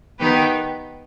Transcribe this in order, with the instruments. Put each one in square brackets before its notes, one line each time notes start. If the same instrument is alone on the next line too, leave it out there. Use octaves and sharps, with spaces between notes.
[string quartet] D#3 B3 D#4 G4 B4